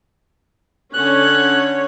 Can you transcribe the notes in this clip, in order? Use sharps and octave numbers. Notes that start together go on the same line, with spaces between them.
D3 C#4 C#5 F#6